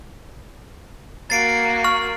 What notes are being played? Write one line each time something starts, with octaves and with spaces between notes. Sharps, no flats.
A#3 F#4 A6 C7 D7
C#6 F6